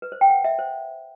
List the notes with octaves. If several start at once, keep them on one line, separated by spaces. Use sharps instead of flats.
B4
C5
G5
F#5
E5
C5